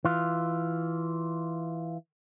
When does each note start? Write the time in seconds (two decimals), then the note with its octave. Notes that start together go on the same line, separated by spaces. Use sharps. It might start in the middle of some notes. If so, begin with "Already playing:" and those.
0.05 E3 F4